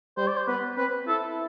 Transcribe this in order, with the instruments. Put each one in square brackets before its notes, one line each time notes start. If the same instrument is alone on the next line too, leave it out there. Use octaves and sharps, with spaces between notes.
[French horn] G3 [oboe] C5
[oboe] D5
C5
[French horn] B3 [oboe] B4
[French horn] C4 [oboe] B4
[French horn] E4 [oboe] A4